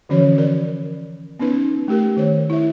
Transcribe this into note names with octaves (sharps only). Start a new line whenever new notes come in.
D3 E3 F3 C#4 F#4 C#5
A#4 D5
B3 C#4 D#4 B4
A3 G4 A#4
D#3 A#4 C5 C#5
E4 E5